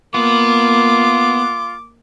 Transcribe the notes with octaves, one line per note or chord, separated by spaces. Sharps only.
A#3 B3 F4 D6